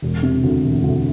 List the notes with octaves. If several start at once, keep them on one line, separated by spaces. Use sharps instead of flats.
E1
C3
D2
E1
D2